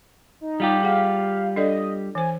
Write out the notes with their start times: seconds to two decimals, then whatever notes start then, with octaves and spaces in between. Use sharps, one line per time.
0.41 D#4
0.60 G3 F4 G4
0.83 G#4 F5 F#5
1.56 D4 A4 D5 D#5
2.15 E3 C5 G#5